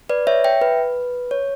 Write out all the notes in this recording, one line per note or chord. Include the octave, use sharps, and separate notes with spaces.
B4 D5
C#5 E5
E5 G5
B4
C#5